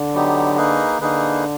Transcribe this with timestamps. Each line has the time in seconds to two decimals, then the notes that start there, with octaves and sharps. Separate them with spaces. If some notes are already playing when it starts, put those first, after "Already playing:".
Already playing: D3
0.13 F#3 B3 D#4 G4
0.57 A#3 D#4 G#4 B4
1.01 D3 A#3 D#4 G#4 B4